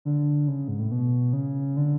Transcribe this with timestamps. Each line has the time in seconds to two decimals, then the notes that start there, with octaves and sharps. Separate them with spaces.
0.05 D3
0.48 C#3
0.68 G#2
0.79 A2
0.91 B2
1.33 C#3
1.77 D3